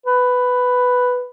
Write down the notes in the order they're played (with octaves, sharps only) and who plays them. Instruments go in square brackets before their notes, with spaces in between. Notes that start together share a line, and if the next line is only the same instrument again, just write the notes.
[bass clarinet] B4